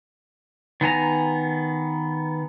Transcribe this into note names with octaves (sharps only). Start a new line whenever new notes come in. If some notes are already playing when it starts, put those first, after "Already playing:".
D#3 B3 G#5 A#5